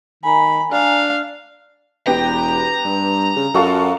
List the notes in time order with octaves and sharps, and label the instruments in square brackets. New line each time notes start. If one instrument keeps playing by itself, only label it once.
[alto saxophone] D#3 [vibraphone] G#5 A#5 [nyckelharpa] B5
[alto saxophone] D4 [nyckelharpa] F5
[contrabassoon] E1 [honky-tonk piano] B3 G4 G5 [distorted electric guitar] A#5
[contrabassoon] G2
C#3
[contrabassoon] F#2 [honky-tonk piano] F4 F#4 A4